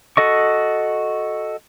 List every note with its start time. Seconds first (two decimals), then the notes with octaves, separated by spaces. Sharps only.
0.17 F#4 A4 D#5 C#6